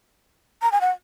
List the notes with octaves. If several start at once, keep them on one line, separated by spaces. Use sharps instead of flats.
A#5
G#5
F#5